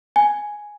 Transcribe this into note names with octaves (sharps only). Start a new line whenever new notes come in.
G#5